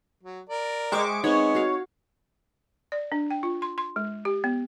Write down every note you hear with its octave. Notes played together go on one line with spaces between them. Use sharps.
F#3
A#4 D5
G#3 C5 E5 G5 C#6 D6
G#3 B3 C4 D#4 C#5
F#4 F5
D5
D4
G5
F4
C6
C6
G#3
G4
B3